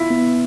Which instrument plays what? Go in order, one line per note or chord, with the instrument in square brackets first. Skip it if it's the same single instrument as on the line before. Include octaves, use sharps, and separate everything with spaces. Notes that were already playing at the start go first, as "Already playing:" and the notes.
Already playing: [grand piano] E4 F4
[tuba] B3